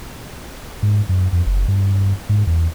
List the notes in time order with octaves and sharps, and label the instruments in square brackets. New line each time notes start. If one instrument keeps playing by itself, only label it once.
[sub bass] G#2
F#2
F2
F#1
G2
G#2
E2